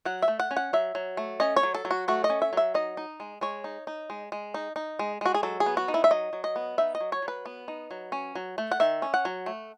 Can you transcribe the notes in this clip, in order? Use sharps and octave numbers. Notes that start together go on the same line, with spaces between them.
F#3 F#5
E5
A3
F#5
C#4
F#5
F#3 E5
F#3
A3
C#4 D#5
C#5
F#3
A4
F#3
F#4
A3 F#4
D#5
C#4
E5
F#3 E5
D#4 D#5
D#4
G#3
G#3 C#5
D#4
D#4
G#3
G#3
D#4
D#4
G#3
G#3 F#4
G#4
F#3 A4
G#4
B3
F#4
D#4
E4
E5
F#3 D#5
F#3
D#5
B3
D#4 E5
D#5
F#3
C#5
F#3
B4
B3
D#4
F#3
C#4
F#3
A3
F#5
D#3 E5
C#4
F#5
F#3
A3